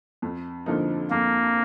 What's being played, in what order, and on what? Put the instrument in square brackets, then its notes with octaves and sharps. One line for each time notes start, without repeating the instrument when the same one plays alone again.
[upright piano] F2
D3 F3 A#3 D#4
[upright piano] F2 [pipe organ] A#3